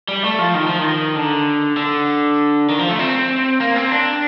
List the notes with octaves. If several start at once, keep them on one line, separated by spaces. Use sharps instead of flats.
G3
A3
F3
D#3
F3
D#3
D3
D3
D#3
F3
A3
C4
A#3
C4
D4